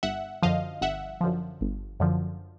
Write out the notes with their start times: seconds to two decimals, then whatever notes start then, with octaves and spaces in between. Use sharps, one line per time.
0.03 G1 E5 F#5
0.43 F#2 D3 F3 D#5 F5
0.81 G1 E5 F#5
1.21 F#2 D3 F3
1.61 G1
2.00 F#2 D3 F3